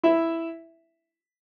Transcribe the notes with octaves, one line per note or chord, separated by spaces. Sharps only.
E4 E5